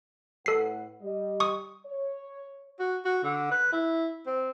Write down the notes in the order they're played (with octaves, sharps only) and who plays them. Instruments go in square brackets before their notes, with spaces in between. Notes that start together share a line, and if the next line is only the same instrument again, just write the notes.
[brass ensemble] A2 B4 F#5 [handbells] A4 C7
[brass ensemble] G3 G4 D#5
[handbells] C#6 D#6
[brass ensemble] C#5
[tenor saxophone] F#4
F#4
D3
B4
E4
C4